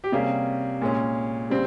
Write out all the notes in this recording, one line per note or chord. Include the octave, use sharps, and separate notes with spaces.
G4
C3 G3 A#3 C#4 G#4
A#2 G#3 C#4
C#3 G3 C4